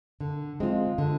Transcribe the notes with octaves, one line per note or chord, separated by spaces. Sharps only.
D3
G#3 C4 F4
D3